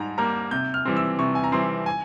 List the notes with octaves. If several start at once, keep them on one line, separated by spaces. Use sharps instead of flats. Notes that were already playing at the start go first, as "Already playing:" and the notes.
Already playing: G#2 G3 G#5 A#5
G3 A#3 A#5
C3 G6
F6
E3 G3 C4
E6
C3 C#6
G#5
A#5
E3 G3 C4 C6
G#5